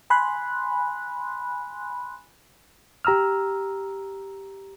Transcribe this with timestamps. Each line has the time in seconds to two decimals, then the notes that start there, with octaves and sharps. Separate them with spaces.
0.10 G#5 B5 C6 F#6
3.05 G4 A#5 E6 F6